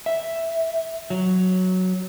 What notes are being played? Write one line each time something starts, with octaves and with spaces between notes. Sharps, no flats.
E5
F#3